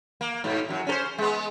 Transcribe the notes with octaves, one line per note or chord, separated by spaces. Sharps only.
A#3
G#2 B2
F#2 F#3
C#4 A4 C5
G#3 B3